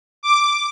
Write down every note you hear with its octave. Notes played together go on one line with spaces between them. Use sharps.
D6